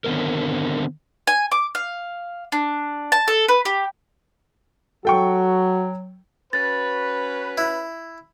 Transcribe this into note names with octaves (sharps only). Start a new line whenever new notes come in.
D3 D#3 B3 C4 A#4
G#5
D6
F5
D4
A5
A4
B4
G4
F#3 F#4 A4 G5 C#6
C#4 F#4 B4 A6
E4